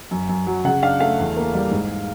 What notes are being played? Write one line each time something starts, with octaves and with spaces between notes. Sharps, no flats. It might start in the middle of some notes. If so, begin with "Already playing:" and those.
F#2
F#2
F#3
C#3 F#5
D4 F5
A3 F5
E2
A#3
G3
G#2